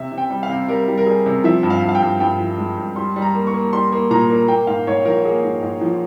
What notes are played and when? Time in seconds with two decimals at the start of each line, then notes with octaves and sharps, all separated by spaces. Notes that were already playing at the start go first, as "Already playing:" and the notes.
Already playing: C3 E5
0.12 C3
0.18 G5
0.30 G3
0.43 F5
0.49 C3
0.68 G3 A#4
0.88 G3
0.98 A#4
1.06 G3 G#4
1.26 C3
1.44 F3 E5
1.63 G2
1.70 F5
1.83 G2
1.89 F5
1.95 G5
2.02 G2
2.20 G2 G5
2.39 F3
2.58 G#3
2.78 G2
2.96 G3 C6
3.16 G3
3.22 A#5
3.35 A#3
3.47 C#6
3.54 A#3
3.73 G3 C6
3.92 A#3
4.10 A#2 A#5
4.30 A#3
4.48 A#3 G5
4.67 G#2 F5
4.87 G#2 C#5
5.05 F3 A#4
5.25 A#3 G#4
5.44 G#2
5.62 G#2
5.81 F3